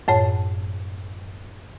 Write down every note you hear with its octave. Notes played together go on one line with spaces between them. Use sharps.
F#2 A2 C#5